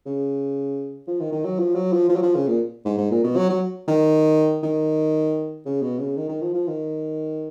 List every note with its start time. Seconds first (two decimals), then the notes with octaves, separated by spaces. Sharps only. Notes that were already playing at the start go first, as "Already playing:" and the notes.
0.06 C#3
1.07 F3
1.20 D#3
1.32 D#3
1.45 F#3
1.59 F3
1.75 F#3
1.93 F3
2.09 F3
2.16 F#3
2.22 F3
2.35 C#3
2.48 A#2
2.85 G#2
2.98 G#2
3.11 A#2
3.24 B2
3.36 F#3
3.50 F#3
3.88 D#3
4.63 D#3
5.65 C#3
5.82 B2
5.99 C#3
6.17 D#3
6.29 D#3
6.42 F3
6.54 F3
6.68 D#3